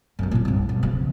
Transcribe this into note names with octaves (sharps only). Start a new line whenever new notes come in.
F#2 F3
A#2 F4
C2 G2
B1
C#3 F3